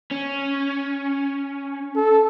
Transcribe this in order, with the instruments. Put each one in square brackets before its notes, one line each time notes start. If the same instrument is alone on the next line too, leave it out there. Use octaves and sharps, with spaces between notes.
[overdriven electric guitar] C#4
[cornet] A4